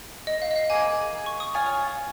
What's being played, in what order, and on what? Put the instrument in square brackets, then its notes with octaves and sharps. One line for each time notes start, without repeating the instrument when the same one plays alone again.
[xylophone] D#5
F5
D#5
F5
[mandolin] A#3 D#4 G#4 [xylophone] G#5
[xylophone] C#6
D#6
[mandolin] F4 C#5 G#5